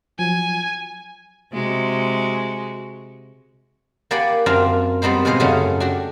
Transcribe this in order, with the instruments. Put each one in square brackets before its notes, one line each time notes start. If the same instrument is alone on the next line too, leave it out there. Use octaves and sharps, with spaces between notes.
[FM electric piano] F3 F#3 [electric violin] G#5
[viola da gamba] C3 G#3 F#4
[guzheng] A#3 G4 D5 F#5 G#5 B5
F#2 C4 D4 F4 A#4 F5
G3 B3 C4 D#4 C5
G#2 B2 G#4 C5 D#5 F5
F#2 C#3 F#3 A3 C#4 D#4
D4 F#4 G4